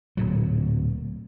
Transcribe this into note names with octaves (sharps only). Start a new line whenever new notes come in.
D1 A#2 F#3